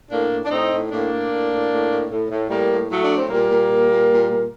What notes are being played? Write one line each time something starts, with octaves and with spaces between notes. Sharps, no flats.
A2 A#3 D4
A2
D4
A2 C4 D#4
A2
A2 A#3 D4
A2
A2
A2
A2
A2
A2
A2
A2 G3 A#3
A2
A2 F#3 A3
D4
A2
C4
A#2 G3 A#3
A#2
A#2
A#2
A#2
A#2